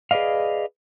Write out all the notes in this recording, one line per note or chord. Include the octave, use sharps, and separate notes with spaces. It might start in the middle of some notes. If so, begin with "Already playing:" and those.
G#4 B4 D5 D#5 F5